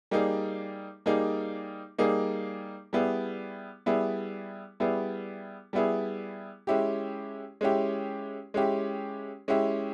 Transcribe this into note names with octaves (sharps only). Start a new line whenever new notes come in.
G3 A#3 D#4 G#4
G3 A#3 D#4 G#4
G3 A#3 D#4 G#4
G3 B3 E4 G#4
G3 B3 E4 G#4
G3 B3 E4 G#4
G3 B3 E4 G#4
G#3 C#4 E4 G4
G#3 C#4 E4 G4
G#3 C#4 E4 G4
G#3 C#4 E4 G4